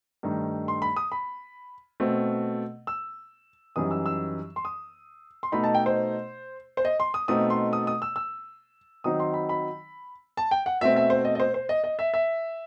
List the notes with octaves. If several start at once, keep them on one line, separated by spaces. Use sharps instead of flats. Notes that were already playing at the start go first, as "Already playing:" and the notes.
G2 D#3 A3 D#4
C6
B5
D#6
B5
B2 A3 C4
E6
F#2 E3 G3 D#4 D#6
E6
E6
C6
D#6
C6
B2 A3 D#4 B5
A5
G5
C5
C5
D#5
C6
D#6
B2 A3 C4 D#4 D#6
C6
D#6
D#6
E6
E6
D#3 F#3 C4 D#4 D#6
C6
B5
B5
A5
G5
F#5
B2 A3 C4 E5
E5
C5
D#5
D#5
C5
C5
D#5
D#5
E5
E5